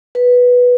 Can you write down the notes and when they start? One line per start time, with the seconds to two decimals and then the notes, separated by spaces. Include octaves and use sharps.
0.15 B4